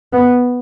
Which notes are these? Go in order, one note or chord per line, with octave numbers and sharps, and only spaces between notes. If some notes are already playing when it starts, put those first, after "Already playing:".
B3